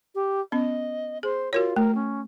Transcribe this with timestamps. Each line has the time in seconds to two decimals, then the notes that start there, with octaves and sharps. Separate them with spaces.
0.15 G4
0.52 B3 C#4 D#5
1.23 G#4 C5
1.53 F4 F#4 A#4 C#5
1.76 A3 A#4
1.95 C#4